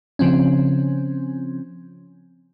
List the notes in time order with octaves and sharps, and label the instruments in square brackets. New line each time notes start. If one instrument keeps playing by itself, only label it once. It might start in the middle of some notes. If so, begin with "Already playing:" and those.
[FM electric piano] C#3 F3 C4 C#4